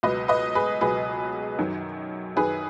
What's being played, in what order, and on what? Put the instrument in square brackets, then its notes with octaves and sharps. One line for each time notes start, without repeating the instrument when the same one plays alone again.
[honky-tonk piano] C#2 B2 F#3 B4 D#5
B4 D#5
G#4 B4
C#2 B2 F#3 G#4 B4
F#2 D#3 F#3
F#2 D#3 F#3 G#4 B4